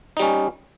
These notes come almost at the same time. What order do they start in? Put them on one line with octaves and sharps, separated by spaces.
D#4 G3 C#4